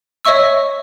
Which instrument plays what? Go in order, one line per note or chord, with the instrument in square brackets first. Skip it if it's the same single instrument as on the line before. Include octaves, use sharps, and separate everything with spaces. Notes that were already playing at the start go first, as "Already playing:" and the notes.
[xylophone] C#5 D#5 E5 C#6 E6